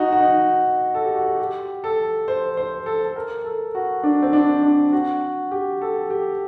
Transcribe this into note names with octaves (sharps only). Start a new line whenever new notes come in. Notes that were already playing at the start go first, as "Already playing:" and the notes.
Already playing: D#4 F#4
F#4
D#4
A4
G4
F#4
G4
G4
A4
C5
C5
A4
A4
A#4
A4
F#4
D4
C4
D4
D4
F#4
G4
A4
G4